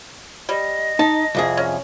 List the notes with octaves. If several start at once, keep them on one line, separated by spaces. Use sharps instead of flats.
G3 D#5
D#4 A5
C2 F2 G#4
C#4